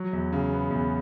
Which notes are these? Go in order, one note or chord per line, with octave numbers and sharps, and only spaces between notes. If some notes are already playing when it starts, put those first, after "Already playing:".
Already playing: F#3
E2
C#3
B3
E2